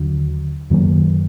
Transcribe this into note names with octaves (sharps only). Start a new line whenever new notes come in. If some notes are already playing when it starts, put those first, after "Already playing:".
Already playing: D#2 D3 F#3
F#2 D#3 F#3 A#3